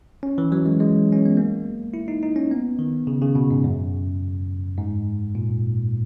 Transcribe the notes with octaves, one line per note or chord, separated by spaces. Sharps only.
C#4
E3
F#3
G#3
G#3
C#4
B3
A#3
E4
D#4
D#4
C#4
B3
D#3
C#3
C#3
B2
G#2
F#2
G#2
A#2